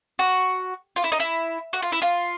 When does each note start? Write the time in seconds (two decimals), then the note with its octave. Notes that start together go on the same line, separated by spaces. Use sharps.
0.19 F#4
0.96 F4
1.04 E4
1.12 D#4
1.20 E4
1.73 F#4
1.82 F4
1.92 E4
2.02 F4